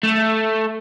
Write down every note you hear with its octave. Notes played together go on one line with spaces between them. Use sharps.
A3